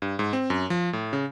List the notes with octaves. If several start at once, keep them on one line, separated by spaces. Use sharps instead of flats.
G2
G#2
C4
F#2
F3
A2
C#3